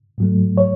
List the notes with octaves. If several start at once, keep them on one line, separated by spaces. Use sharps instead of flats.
G#2 F#3 A3
C#5